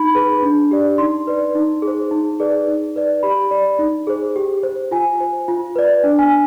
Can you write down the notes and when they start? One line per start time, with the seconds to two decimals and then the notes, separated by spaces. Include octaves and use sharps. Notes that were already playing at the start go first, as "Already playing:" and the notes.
Already playing: D#4 B5
0.15 G#4 B4
0.43 D4
0.71 G4 D5
0.98 D#4 C6
1.27 B4 D5
1.55 D#4
1.82 G#4
1.88 C5
2.11 D#4
2.40 G#4 B4 D5
2.68 D#4
2.96 B4 D5
3.23 G4 B5
3.51 D5
3.79 D#4
4.07 G#4 C5
4.36 G4
4.63 C5
4.91 F4 G#5
5.20 C5
5.48 F4
5.76 B4 D5
6.04 D4
6.19 G#5